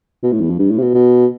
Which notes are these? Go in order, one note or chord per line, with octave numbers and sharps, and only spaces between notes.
B2
A2
E2
F2
G2
A2
C3
B2
B2